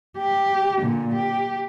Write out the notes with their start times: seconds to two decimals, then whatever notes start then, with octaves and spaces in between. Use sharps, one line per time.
0.18 G4
0.82 A#2 D3
1.14 G4